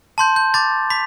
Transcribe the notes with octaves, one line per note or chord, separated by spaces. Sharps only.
A5 C6 G6
G6
B5 D6 G6 A6
B5 B6